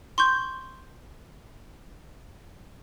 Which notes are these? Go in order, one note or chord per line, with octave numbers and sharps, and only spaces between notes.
C6 C#6 G6